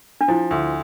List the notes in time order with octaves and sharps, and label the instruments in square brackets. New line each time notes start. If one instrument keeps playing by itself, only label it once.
[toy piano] D4
[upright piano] F3 [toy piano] E4
[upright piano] D2